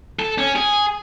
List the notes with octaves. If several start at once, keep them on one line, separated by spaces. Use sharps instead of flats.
A4
C#4
G#4